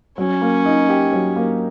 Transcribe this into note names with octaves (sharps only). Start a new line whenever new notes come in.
F#3 C#4
A#3
D#4
G4
F#3
A#3